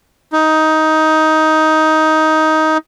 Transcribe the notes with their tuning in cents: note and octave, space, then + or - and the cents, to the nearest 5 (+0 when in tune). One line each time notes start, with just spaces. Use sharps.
D#4 +15